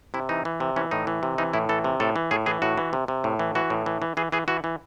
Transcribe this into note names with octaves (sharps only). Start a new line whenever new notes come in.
C3 E4
E3 D#4
E3
C3
E3 C#4
A2 D#4
E3
C3
E3 D#4
A2 E4
E3 A4
C3
A2 A4
E3
A2 G#4
E3 G#4
A2 F#4
E3
C3
C3
A2
E3
E3 F#4
A2
E3
E3
E3 G#4
E3 G#4
E3 F#4
E3